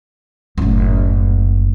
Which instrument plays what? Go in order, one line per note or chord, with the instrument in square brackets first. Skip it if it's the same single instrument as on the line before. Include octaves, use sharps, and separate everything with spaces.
[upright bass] F#1 A2